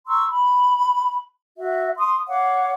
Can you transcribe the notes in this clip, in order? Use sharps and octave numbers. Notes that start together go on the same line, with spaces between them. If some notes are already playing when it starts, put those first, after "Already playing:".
A#5 C6 C#6 E6
B5
F#4 E5
C6 D#6
C#5 F5 F#5 D6